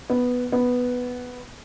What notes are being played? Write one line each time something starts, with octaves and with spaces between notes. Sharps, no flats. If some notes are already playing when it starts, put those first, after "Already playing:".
B3
B3